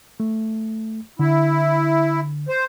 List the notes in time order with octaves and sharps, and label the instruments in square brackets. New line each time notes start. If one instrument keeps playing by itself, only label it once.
[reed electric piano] A3
[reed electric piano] D3 [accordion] E4
[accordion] C5